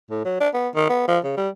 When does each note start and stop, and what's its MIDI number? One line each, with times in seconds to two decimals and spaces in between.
0.10 0.23 45
0.25 0.39 54
0.40 0.49 62
0.54 0.68 59
0.75 0.86 51
0.89 1.06 59
1.08 1.19 53
1.24 1.33 49
1.37 1.49 55